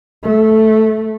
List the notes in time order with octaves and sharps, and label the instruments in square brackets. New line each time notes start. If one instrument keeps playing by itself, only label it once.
[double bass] A3